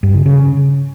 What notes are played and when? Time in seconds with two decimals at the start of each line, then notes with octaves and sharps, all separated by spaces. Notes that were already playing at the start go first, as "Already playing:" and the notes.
0.03 G2
0.14 C#3
0.26 C#3